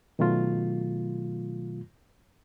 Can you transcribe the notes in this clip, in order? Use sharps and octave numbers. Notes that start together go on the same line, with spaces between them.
B2 D#3 F#3 A3 F4